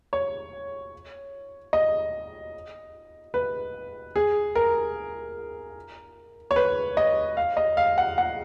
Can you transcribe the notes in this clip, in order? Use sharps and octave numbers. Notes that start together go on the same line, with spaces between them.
C#5
D#5
B4
G#4
A#4
C#5
B4
D#5
F5
D#5
F5
F#5
F#5